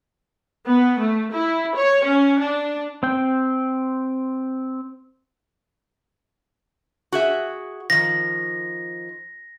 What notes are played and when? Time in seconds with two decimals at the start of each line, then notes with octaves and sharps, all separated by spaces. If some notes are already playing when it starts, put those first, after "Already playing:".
0.68 B3
1.01 A3
1.33 E4
1.76 C#5
2.06 C#4
2.40 D4
3.03 C4 G5
7.12 F#4 G#4 E5
7.90 D#3 F3 A#6